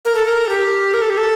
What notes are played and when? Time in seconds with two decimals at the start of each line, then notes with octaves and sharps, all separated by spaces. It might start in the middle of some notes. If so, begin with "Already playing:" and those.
0.05 A#4
0.15 A4
0.26 A#4
0.46 A4
0.49 G4
0.94 A#4
1.02 A4
1.10 G4
1.17 A4